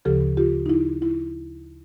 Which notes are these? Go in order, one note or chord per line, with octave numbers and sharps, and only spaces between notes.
D2 C#3 F3 G4 A4
F4 G4
D#4
E4
E4